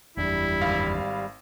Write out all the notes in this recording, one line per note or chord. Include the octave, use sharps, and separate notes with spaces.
F#1 E2 G3 D4 E4
G#1 F5 B5